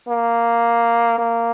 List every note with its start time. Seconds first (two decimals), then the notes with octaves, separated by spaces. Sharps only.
0.08 A#3
1.18 A#3